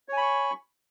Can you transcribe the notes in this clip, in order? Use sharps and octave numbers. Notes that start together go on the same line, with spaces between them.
C#5 G#5 B5 C#6